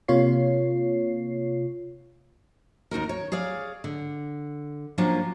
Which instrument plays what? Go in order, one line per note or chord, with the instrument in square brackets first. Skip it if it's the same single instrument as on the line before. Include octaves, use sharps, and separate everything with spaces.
[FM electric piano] C3 A#3 F4 C#5 C7
[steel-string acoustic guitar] D#2 D#4 F#4 A#4
C#5
G#4 C#5 D5 F5
D3
F3 F#3 A#3 C#4 D4 F4